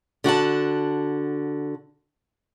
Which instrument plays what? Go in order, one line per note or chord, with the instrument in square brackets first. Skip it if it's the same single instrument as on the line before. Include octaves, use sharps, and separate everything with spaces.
[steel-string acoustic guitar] D3 F#4 E5 A5